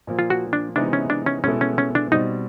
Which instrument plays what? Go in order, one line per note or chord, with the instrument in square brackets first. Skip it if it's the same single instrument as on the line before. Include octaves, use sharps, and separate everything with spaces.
[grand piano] A#2 F3 A#3
[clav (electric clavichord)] F4
F#4
D4
[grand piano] C3 E3 G#3 B3 D#4 [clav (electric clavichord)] D4
[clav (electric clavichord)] C#4
D4
C#4
[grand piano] B2 G#3 B3 E4 A4 [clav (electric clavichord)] C#4
[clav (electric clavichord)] C#4
C#4
D4
[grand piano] B2 G3 C4 [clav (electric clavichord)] D#4